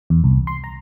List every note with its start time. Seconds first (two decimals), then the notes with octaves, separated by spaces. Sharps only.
0.10 E2
0.24 C2
0.47 C6
0.64 A#5